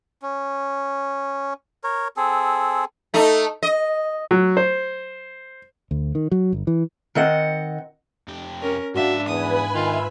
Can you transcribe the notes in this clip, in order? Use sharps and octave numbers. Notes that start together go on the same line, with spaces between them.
C#4
A#4 C#5
C4 G#4 A4
A3 D#4
D#5
F#3
C5
D2
D#3
F#3
G1
E3
D#3 C4 D#5 F#5
F2 G4
C#4 A#4
G#2 D4 F#4 E5 F5
E2 B4 G#5 B5 D#6
D#3 F4 E5